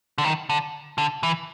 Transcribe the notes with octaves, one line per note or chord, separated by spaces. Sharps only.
D3
D#3
D3
D3
E3